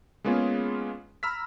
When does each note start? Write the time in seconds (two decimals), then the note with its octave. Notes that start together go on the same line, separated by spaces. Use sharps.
0.25 G#3 A#3 B3 C#4 F4 G#4
1.23 A#5 B5 E6 F6 B6